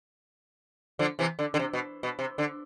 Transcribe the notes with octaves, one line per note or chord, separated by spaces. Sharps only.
D3 F3
C3 E3
D3
D3
C3
B2
B2
C3
D3